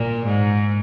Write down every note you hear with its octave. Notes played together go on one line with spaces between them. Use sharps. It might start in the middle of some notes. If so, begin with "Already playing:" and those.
Already playing: A#2
G#2